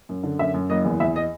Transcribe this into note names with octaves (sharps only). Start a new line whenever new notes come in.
F#2
D3
F#2 E5
F#2
F#1 D#5
E2
E2 E5
D#5